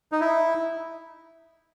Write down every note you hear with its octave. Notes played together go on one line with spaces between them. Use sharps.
D#4
E4